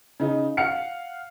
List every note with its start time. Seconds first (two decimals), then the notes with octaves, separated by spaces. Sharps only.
0.20 C#3 D#4
0.57 F5 F#5 F6 C#7